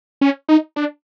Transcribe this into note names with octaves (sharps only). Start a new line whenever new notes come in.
C#4
D#4
D4